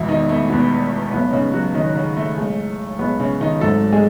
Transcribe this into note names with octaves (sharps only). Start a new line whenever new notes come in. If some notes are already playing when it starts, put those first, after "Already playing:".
Already playing: E1 E2 B2 E3 E4
D#3 D#4
A3
E1 E2 B2 B3
B1 A2 E3 B3
D#4
C#3 C#4
F#3 F#4
B1 A2 D#3 E3 D#4
C#3 C#4
A3
B1 A2 G#3
B1 A2 G#3 B3
C#3 C#4
D#3 D#4
G#1 G#2 F#3 A3 A4
G#3 G#4